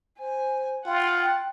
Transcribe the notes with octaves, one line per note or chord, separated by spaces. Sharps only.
C5 G#5
F4 F#5 G5